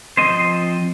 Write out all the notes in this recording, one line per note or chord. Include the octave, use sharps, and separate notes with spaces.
F3 C4 C5 D#5